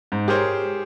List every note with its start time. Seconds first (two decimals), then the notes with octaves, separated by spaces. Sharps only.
0.12 G#2
0.28 G4 G#4 A#4 C5 C#5